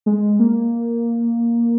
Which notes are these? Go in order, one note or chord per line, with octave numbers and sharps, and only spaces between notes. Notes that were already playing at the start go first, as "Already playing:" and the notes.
G#3
A#3